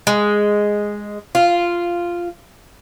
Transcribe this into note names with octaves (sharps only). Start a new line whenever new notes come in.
G#3
F4